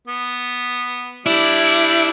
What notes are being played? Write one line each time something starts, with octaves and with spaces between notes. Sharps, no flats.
B3
G3 D4 E4